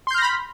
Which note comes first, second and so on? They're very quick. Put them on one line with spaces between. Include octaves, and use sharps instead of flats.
C6 G6 F6 A#6 B5